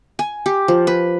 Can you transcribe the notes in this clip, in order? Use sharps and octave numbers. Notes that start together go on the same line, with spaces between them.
G#5
G4
F3
B4